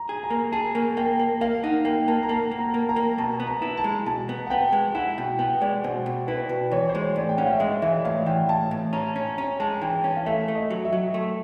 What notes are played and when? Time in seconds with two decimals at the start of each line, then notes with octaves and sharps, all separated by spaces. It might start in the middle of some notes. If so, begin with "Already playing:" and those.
Already playing: A#5
0.09 G#4
0.23 A#5
0.30 A#3
0.52 G#4 A5
0.75 A#3
0.97 A#3 G5
1.19 A#3
1.41 A#3 F5
1.63 D#4 F#5
1.85 A#3 G5
2.08 A#3 A5
2.23 A#5
2.29 A#3 A5
2.51 A#3
2.59 A#5
2.74 A#3
2.89 A#5
2.96 A#3
3.18 B2 A5
3.40 B3
3.47 A#5
3.62 E4
3.77 A5
3.84 G#3
4.06 B2 A5
4.29 B3
4.47 F#5
4.50 B3 G5
4.72 G#3
4.95 E4 F#5
5.18 B2 G5
5.39 B3 G5
5.62 G#3 D5
5.84 B2 C5
6.06 B2
6.27 E4 B4
6.49 B2
6.71 E3 C#5
6.89 C5
6.95 G#3
7.03 C#5
7.16 A2 D5
7.29 G5
7.37 C#4 F#5
7.46 F5
7.52 E5
7.60 G#3 D#5
7.82 E3 E5
8.05 A2 F5
8.26 E3 G5
8.49 A2 A5
8.71 A2
8.93 C#4 A#5
9.16 C#4
9.38 C#4 A#5
9.60 G#3 A5
9.81 E3 G5
10.04 C#4
10.17 F5
10.26 A3 E5
10.48 A3
10.55 D#5
10.70 F#3
10.85 E5
10.93 F#3
11.14 A3